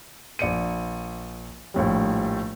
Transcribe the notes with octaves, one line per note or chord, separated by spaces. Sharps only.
A#1 D5 C#7 D#7
A#1 A2 G3